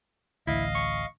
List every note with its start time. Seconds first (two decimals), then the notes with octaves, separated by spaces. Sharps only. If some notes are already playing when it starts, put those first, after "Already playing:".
0.47 A1 D2 E4 D#5 F5
0.75 C#6